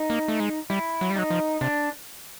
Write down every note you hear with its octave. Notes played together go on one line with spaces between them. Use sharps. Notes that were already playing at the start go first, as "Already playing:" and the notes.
Already playing: D#4
A#3
A3
G#3
G3 E4
F#3
G3
F#3 D#4
F3
C3 D4